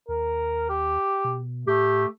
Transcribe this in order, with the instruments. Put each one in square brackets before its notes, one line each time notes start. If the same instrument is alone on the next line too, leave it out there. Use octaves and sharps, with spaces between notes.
[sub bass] D#2 [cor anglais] A#4
[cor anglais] G4
[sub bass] B2
[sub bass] A2 [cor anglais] A3 [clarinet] G4